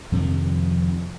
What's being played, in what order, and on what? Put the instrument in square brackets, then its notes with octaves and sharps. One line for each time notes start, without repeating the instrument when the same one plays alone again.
[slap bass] F2 C3 D#3 F3